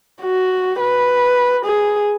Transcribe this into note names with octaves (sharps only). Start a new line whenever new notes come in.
F#4
B4
G#4